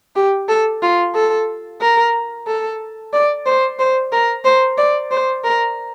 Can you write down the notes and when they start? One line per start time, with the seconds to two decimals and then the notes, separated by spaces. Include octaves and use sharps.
0.16 G4
0.48 A4
0.82 F4
1.15 A4
1.81 A#4
2.47 A4
3.13 D5
3.46 C5
3.79 C5
4.12 A#4
4.44 C5
4.78 D5
5.11 C5
5.44 A#4